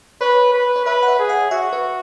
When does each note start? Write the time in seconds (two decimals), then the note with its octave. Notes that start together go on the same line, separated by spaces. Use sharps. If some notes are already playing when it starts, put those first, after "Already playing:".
0.21 B4 C#5
0.53 B4
0.76 C#5
0.85 B4 E5
1.03 F#5
1.08 E5
1.19 G#4
1.29 F#5
1.51 F#4 E5
1.73 B4